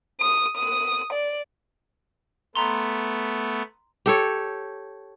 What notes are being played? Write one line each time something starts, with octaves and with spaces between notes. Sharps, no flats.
D#6
D#6
D5
A3 B3 A#5 C6
G4 A4 C#5